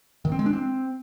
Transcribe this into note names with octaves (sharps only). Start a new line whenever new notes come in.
D#3
C4
G#3
D4
C4